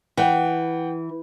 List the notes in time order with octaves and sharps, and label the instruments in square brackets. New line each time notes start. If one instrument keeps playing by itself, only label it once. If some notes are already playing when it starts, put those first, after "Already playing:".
[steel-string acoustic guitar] E3 [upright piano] F#5 G5